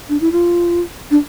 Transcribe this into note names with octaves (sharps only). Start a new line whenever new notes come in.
D4
E4
F4
D4